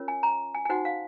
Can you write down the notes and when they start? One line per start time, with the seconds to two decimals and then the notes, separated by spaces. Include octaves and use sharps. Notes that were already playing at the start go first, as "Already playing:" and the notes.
Already playing: C#4 F4 A#4 C#5
0.08 G#5
0.23 A#5
0.55 G#5
0.65 G#5
0.69 D#4 F#4 C5 F#5
0.85 F5